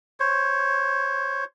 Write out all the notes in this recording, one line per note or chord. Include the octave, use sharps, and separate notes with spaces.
C5 C#5